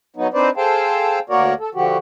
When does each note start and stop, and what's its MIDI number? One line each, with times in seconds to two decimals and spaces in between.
0.16 0.27 54
0.16 0.27 59
0.16 0.27 63
0.34 0.50 60
0.34 0.50 62
0.34 0.50 63
0.34 0.50 71
0.34 0.50 72
0.34 0.50 74
0.57 1.19 68
0.57 1.19 69
0.57 1.19 72
0.57 1.19 77
0.57 1.19 79
0.57 1.19 81
1.30 1.54 38
1.30 1.54 58
1.30 1.54 66
1.30 1.54 70
1.30 1.54 73
1.30 1.54 74
1.60 1.69 69
1.75 1.97 50
1.75 1.97 53
1.75 1.97 66
1.75 1.97 67